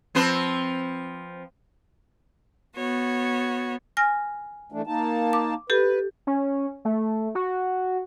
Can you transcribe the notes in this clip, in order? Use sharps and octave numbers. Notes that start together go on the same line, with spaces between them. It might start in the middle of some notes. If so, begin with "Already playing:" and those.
F3 C4 B4
B3 F#4 C#5
G#5 F6 A#6
E3 A3 D4
A#3 D#4 A5
D6
G4 A4 B4
C#4
A3
F#4